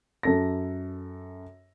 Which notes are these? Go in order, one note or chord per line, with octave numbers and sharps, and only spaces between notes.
F#2 A4 A#6